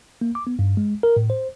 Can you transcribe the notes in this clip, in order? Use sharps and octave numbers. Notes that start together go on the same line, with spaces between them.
A#3
D6
B3
G2
G#3
A#4
A2
C5